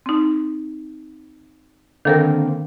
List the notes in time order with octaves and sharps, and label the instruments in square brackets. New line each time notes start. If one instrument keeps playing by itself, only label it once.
[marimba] C4 D#4
[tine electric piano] D3 A#3 C4 [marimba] D#3 A4 A#4